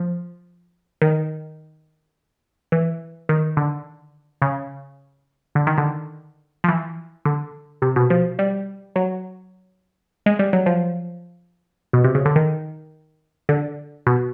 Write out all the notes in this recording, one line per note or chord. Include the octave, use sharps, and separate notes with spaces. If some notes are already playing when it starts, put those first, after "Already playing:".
Already playing: F3
D#3
E3
D#3
D3
C#3
D3
D#3
D3
F3
E3
D3
C3
B2
F3
G3
F#3
G#3
G3
F#3
F3
B2
C3
C#3
D3
D#3
D3
B2